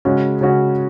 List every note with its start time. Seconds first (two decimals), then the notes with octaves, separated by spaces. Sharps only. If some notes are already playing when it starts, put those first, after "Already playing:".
0.05 C#3 G#3 C#4 F#4
0.41 C#3 G#3 C#4 F#4